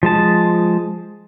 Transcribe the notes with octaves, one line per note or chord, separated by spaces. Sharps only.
F3 G#3 A5